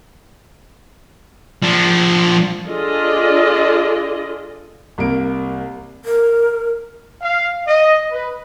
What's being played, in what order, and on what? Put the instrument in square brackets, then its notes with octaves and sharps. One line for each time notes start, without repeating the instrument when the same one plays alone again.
[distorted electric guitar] F3 D4
[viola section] D4 F4 G#4 A4 D5 D#5
[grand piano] C2 A#3 D7
[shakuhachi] A#4
[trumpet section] F5
D#5
B4